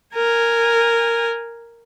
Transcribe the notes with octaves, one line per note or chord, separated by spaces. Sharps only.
A#4 G#5